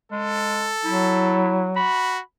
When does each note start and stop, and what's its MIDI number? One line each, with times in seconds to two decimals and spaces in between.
0.12 0.73 56
0.12 1.58 69
0.85 1.86 54
0.85 1.67 64
1.76 2.21 66
1.76 2.20 83